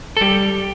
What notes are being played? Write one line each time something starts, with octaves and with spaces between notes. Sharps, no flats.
A4
G3 G4